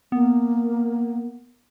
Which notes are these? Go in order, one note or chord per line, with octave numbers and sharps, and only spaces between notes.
A#3 B3